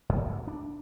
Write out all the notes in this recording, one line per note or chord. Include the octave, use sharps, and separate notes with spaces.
G2
D2
D4